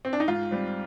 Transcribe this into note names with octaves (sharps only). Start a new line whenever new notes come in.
C4
D4
D#4
G#2 F4
G3 C4